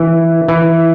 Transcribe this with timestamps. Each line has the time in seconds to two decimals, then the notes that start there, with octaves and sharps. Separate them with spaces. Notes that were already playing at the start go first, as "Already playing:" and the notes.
Already playing: E3
0.48 E3